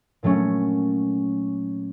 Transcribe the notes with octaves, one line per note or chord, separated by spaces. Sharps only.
A#2 F#3 A3 C#4